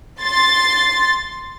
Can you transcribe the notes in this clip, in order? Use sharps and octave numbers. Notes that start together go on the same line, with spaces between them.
C6 A6